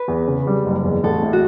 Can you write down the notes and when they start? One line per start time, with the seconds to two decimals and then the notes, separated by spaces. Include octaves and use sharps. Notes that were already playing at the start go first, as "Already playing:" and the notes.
Already playing: B4
0.08 E2
0.27 C#3
0.47 G3
0.66 F#1
0.84 E2
1.03 A1 A4
1.22 A2
1.33 F#4